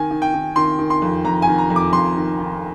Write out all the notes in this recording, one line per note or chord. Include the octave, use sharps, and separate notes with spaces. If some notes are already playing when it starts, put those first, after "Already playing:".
Already playing: D#3 G#5
D#3
G5
D#3
D#3 C6
D#3
C6
F2
F2 A#5
G#5
D#3
A#5
F2
D6
F2 C6
D#3
D#3